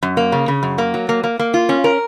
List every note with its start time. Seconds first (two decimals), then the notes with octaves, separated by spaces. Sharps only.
0.03 F#2
0.17 A#3
0.32 C#3
0.48 C#3
0.63 F#2
0.78 A#3
0.94 F#3
1.09 A#3
1.24 A#3
1.39 A#3
1.54 F4
1.69 C#4
1.84 A#4